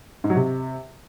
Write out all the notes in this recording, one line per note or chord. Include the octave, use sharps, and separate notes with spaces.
G#2
F#3
C3